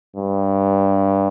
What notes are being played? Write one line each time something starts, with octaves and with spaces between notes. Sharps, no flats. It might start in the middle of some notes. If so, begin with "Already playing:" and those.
G2